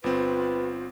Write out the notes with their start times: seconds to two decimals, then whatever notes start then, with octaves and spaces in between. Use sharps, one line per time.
0.04 G1 C4 F4 B4